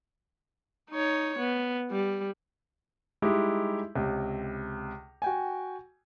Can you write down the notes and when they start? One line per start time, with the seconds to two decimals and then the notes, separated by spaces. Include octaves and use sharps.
0.91 D#4 C#5
1.38 B3
1.91 G3
3.22 G3 G#3 D#4 E4 G4
3.96 C#2 C3
5.22 F#4 G5 G#5